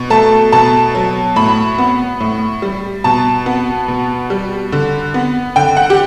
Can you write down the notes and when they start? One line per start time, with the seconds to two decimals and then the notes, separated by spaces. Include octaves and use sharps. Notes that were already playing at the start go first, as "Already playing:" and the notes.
Already playing: B2
0.10 A3 A5
0.52 B2 A5
0.95 F#3
1.36 A2 B5
1.78 B3
2.20 A2
2.62 G3
3.04 B2 A5
3.46 B3
3.88 B2
4.30 G3
4.72 D3
5.14 B3
5.56 D3 G5
5.77 F#5
5.90 G4